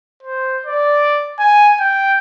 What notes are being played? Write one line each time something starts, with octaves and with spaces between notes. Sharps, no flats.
C5
D5
G#5
G5